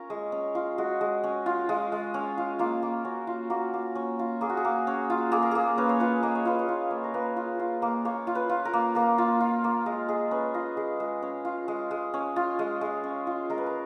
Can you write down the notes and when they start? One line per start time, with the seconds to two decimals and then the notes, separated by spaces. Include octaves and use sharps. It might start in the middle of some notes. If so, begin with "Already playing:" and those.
Already playing: C#4 F4 A#4
0.10 G#3
0.32 C#4
0.55 F4
0.78 G#3 F#4
1.01 G#3
1.24 C#4
1.46 F4
1.69 G#3 F4
1.92 G#3
2.14 C#4
2.38 F4
2.59 A#3 F4
2.82 A#3
3.05 C#4 F#4
3.27 F4
3.50 A#3 F#4
3.73 A#3
3.95 C#4
4.19 F4
4.41 A#3 G#4
4.49 F#4
4.57 G#4
4.65 A#3
4.87 C#4
5.10 F4
5.32 A#3 G#4
5.42 A#4
5.51 A#3 G#4
5.78 C#4 B4
5.89 C#5
6.00 F4 B4
6.23 A#3 D#5
6.35 C#5
6.45 F4 B4
6.59 C#5
6.69 F4
6.91 A#3
7.04 A#4
7.14 A#3 B4
7.36 F4
7.59 F4
7.82 A#3
8.05 A#3 C#5
8.27 F4
8.35 B4
8.49 F4
8.65 A#4
8.73 A#3
8.95 A#3 A#4
9.18 F4
9.40 F4
9.64 A#3
9.86 G#3 A#4
10.08 G#3 G#4
10.31 C#4 B4
10.54 F4 D#5
10.77 G#3 G#4
11.00 G#3
11.22 C#4
11.45 F4
11.68 G#3
11.91 G#3
12.14 C#4
12.36 F4
12.59 G#3
12.81 G#3
13.04 C#4
13.27 F4
13.49 G#3 A#4
13.58 B4
13.66 A#4